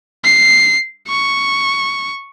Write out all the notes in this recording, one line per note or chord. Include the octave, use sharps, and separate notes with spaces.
C7
C#6